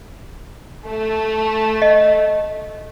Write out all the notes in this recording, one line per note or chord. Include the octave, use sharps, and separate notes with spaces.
A3
D#5